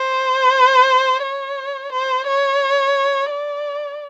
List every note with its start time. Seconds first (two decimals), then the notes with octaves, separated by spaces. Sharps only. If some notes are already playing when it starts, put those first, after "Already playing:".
Already playing: C5
1.23 C#5
1.92 C5
2.27 C#5
3.30 D5